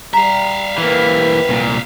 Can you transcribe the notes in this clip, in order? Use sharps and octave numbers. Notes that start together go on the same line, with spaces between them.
G3 E5 F5 A#5
C3 E3 A#3 G4 B4
C2 A#2